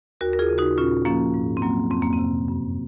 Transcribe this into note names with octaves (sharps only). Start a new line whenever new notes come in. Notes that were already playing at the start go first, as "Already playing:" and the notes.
D#2 F#4 A#4
A#4
F4 G#4
C#3
D#4 F#4
A#2 C#4 F4
F3 A#3 C#4
G#2
C4
F#3 A#3
F2 C4
A#3
C4
C3
F#2